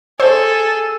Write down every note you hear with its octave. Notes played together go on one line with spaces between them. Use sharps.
G#4 A4 C5 E6